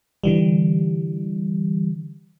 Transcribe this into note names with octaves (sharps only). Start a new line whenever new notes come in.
D3 E3 G3